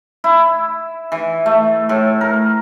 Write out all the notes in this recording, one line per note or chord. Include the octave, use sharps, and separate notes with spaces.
E4
E3
A3
A2
A#4